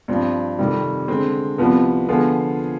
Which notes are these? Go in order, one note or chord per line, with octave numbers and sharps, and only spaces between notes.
G2 F3 C4
F2 C3 D#3 G3
D3 G#3 C4
C2 C3 F3 B3
D3 F3 B3 F4 G#4